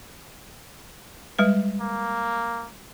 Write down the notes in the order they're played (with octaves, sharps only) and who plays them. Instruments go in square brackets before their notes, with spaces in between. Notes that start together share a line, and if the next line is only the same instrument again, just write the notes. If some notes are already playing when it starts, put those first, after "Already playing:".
[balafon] G3 G#3 B4
[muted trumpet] A#3